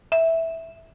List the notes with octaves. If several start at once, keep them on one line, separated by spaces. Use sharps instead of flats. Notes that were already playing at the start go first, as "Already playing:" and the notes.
E5